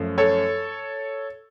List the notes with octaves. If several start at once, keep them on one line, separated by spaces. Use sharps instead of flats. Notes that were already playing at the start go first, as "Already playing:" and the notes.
Already playing: F#2 F3 A3
A4 C#5